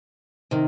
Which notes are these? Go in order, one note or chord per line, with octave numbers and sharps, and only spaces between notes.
C3 D#3